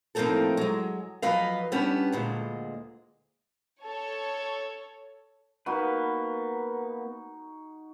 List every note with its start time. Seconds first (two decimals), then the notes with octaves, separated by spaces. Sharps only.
0.15 A2 F3 A#3 C4 D#4 A4
0.57 F#3 G#3
1.22 F3 F#3 B4 D#5 F5
1.72 G3 B3 C#4 D4 G4
2.12 D2 A#2 G#3
3.81 A4 C#5
5.66 A#3 B3 D#4 F#4 B4